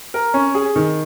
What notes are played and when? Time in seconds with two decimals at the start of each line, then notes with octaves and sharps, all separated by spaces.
0.14 A#4
0.34 C#4
0.55 G#4
0.76 D#3